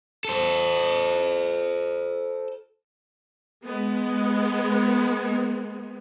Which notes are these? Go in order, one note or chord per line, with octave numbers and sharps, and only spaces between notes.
A4 C5
G#3 B3